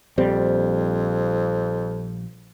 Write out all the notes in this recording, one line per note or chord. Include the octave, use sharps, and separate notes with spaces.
A#1 F2 G3 C4